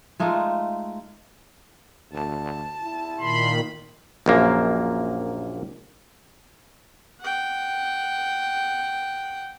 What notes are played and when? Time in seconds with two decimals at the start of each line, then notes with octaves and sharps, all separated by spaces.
0.20 G#3 A3 D#4 F4
2.12 D2 A5
2.82 E4
3.21 A#2 D#3 B5 C6
4.26 A#1 F#2 A#3
7.21 F#5 G5